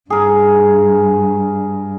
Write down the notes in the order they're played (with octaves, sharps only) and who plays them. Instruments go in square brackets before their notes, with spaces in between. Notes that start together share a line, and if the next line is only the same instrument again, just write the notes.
[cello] G2 [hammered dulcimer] G#4 A#4